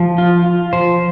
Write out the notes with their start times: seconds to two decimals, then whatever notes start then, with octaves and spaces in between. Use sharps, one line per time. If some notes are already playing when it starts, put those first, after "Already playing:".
Already playing: F3
0.18 F4
0.46 F4
0.73 F3 C5